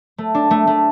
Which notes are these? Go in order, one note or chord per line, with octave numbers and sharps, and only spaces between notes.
A3
D4
A3
A3